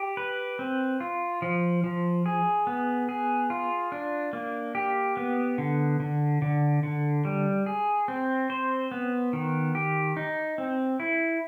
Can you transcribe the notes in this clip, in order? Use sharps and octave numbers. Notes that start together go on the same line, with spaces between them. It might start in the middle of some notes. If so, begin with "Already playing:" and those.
Already playing: G4
B4
C4
F4
F3
F3
G#4
B3
G#4
F4
D4
A#3
G4
B3
D3
D3
D3
D3
G3
G#4
C4
C5
B3
D#3
G4
D#4
C4
E4